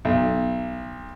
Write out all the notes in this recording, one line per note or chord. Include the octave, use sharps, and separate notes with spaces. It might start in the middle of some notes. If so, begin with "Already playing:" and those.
B1